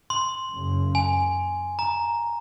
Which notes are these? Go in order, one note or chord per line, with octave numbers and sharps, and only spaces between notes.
C6
F#1 F#2 C#3
G#5
A#5